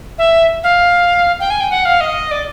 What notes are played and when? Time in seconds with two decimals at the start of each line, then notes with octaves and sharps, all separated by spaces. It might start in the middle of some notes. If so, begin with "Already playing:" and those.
0.18 E5
0.63 F5
1.39 G5
1.50 G#5
1.60 G5
1.70 F#5
1.85 F5
2.00 D#5
2.31 D5